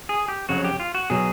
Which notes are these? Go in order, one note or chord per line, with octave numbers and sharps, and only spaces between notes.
G#4
G4
F2 C#3 F#3 F#4
G4
F4
F#4
B2 F#3 G#4